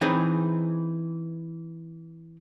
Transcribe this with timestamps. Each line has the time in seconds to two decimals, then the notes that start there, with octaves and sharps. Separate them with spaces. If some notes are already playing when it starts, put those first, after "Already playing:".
0.01 E3 C4 D#4 G#4 B4